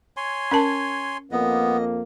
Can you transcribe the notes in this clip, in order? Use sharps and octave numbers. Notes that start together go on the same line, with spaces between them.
C#5 G#5 C6
C#4 A#4 A5
F2 A#3 B3 D#5